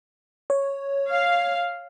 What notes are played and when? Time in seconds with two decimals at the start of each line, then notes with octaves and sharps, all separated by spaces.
0.50 C#5
1.09 F5